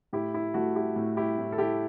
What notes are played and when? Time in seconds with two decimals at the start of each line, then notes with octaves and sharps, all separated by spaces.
0.13 A2 E4 G4
0.34 E4
0.54 A3 F#4
0.76 E4 G4
0.96 A2
1.17 E4 G4
1.38 A2
1.52 A4
1.58 E4 G4